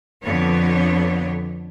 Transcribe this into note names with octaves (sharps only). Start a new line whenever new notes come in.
F2 D3 B3 C#5